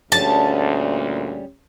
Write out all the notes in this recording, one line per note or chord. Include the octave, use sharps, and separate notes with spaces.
D2 A#2 G3 C#4 G#4 A5